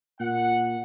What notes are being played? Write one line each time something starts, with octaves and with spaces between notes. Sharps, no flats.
A#2 F#5